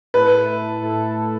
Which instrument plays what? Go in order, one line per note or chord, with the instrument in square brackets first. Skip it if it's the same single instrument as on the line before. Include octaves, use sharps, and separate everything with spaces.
[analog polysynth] A2 A3 E4 A4 [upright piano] B4
[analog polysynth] A2 A3 E4 A4